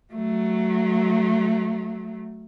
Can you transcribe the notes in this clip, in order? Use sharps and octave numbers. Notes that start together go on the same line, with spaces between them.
F#3 A3